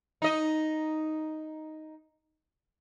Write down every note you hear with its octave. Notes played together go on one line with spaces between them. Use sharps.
D#4 D#5